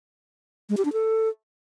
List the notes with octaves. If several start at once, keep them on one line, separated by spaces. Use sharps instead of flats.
G#3
G4
D4
A4